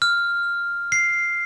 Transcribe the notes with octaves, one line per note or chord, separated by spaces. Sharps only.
F6
C7